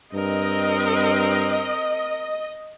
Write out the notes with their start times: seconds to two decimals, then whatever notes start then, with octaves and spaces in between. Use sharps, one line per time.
0.14 G2 C4 A#4 D#5